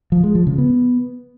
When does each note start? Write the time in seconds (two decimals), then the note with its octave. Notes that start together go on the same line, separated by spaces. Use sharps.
0.12 F3
0.23 G#3
0.35 F3
0.47 C#3
0.58 B3